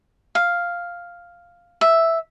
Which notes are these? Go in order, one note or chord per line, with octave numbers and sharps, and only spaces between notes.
F5
E5